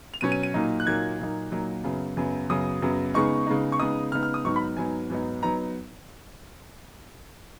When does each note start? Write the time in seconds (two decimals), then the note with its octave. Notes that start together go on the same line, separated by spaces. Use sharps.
0.14 F7
0.21 B2 F#3 C#4 D#7
0.32 D#7
0.43 D#7
0.54 A#2 F#3 A#3 D#4
0.80 F#6
0.86 A#2 F#3 A#3 D#4 G#6
1.19 A#2 F#3 A#3 D#4
1.51 A#2 F#3 A#3 D#4
1.84 F#2 C#3 F#3 B3
2.17 F#2 C#3 F#3 B3
2.50 F#2 C#3 F#3 B3 D#6
2.82 F#2 C#3 F#3 B3
3.14 C#3 G#3 B3 D#4 C#6
3.47 C#3 G#3 B3 D#4
3.72 C#6
3.79 C#3 G#3 B3 D#4 D#6
4.12 C#3 G#3 B3 D#4 F6
4.23 F6
4.34 D#6
4.45 G#2 F#3 B3 D#4 C#6
4.56 B5
4.77 G#2 F#3 B3 D#4 G#5
5.10 G#2 F#3 B3 D#4
5.43 F#3 B3 D#4 A#5